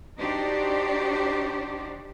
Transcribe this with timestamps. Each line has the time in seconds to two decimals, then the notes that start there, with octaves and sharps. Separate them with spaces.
0.18 D4 D#4 F#4 G4 C5 D5